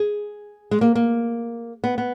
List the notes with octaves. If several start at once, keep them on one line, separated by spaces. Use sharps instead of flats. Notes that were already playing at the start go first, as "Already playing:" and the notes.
Already playing: G#4
G#3
A#3
A#3
B3
B3